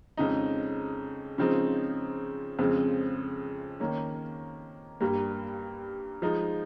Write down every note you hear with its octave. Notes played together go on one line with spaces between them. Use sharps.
F2 C#3 G#3 D#4
C#3 F3 G#3 C4 D#4
F2 C#3 F3 G#3 C4
D#3 A#3 C#4
G2 G3 A#3
F3 G#3 D#4